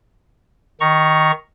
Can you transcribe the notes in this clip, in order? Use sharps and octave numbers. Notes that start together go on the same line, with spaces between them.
D#3 A#5 C#6